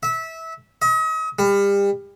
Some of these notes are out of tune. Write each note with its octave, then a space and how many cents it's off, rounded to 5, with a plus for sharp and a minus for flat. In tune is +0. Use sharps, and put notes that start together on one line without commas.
E5 -20
D#5 +40
G3 +30